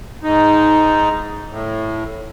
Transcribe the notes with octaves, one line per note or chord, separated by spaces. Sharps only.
G#2 D#4
A2